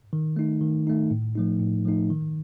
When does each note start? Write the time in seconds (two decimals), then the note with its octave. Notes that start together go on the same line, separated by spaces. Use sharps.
0.13 D#3
0.36 A3 D#4
0.61 D#3
0.87 A3 D#4
1.11 A2
1.35 F3 A3 D#4
1.60 A2
1.85 F3 A3 D#4
2.10 D#3